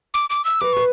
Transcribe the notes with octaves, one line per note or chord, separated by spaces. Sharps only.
D6
D6
E6
B4 D6
B4 C#6